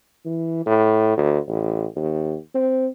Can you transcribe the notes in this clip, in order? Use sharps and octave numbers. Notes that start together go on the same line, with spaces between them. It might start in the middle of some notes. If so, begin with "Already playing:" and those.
E3
A2
D2
A1
D#2
C4